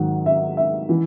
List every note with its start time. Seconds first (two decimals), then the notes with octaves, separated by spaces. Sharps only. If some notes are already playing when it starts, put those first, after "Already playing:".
Already playing: G#2 D#3 F#3 F#5
0.26 E5
0.57 E5
0.89 E3